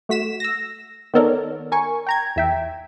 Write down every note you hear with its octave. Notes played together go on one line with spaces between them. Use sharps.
A3 F#4 B6 E7
E6 A#6
D#3 B3 A4 A#4 C#5 D5
A#4 G#5 C#6
G5 A#5 G#6
E2 E5 G5